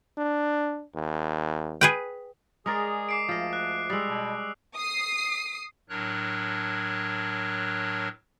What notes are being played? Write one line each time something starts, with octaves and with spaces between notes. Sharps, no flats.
D4
D#2
G#4 B4 G5
G#3 G#4 A#4 D5 D#6
D6 C7 D7
D2 F3 D#5
F#6
G3 G#3 D#6 E6
B2
D#6 C7
A2 F#3 D4 A#4 C#5 F#6